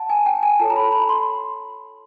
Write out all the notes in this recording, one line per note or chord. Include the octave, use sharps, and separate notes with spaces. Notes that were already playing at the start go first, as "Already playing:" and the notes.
Already playing: F#5 A5
G#5
G5
G#5
F4 A4 C#5 A5
A#5
B5
B5
C6